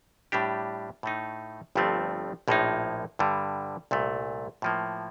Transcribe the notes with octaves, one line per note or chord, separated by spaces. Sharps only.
A2 G3 D4 G4
A2 A3 D#4
G1 G2 F3 A3 C4
A#1 A2 F3 A#3 D#4
G2 D3 G3
C2 A#2 A3
A2 F3 A#3